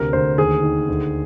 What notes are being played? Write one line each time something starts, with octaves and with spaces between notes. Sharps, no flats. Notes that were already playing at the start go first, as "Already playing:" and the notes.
Already playing: D2 C3 A#4
D2 C5
D#2 G#4
D#3
D2